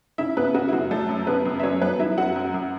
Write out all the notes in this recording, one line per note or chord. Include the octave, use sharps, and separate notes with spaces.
C#3 E4 E5
C#3 B3 B4
C#3 F#4
E4
F#2 F#4
F#3 A3 A4
F#2
C#3 B3 B4
F#2
E5
F#3 C#4 C#5
F#3 B3 B4
F#3 E4 E5
F#2 F#4 F#5
F#2
F#2